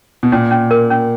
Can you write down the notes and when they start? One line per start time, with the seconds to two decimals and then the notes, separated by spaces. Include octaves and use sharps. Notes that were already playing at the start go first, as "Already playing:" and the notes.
0.23 B2
0.32 A#2 C#4
0.51 C#4
0.71 A#4
0.90 C#4